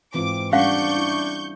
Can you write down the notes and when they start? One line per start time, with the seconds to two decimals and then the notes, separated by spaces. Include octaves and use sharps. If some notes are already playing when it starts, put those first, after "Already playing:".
0.14 G#2 E3 C4 F4 D6
0.53 G3 C#4 D4 F5 F#5 C#6 G6
0.97 E4